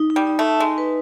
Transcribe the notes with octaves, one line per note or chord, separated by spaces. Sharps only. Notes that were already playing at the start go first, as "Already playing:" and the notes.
Already playing: D#4
D#4
G3
D#4
A3 D#4
G#3 D#4
B4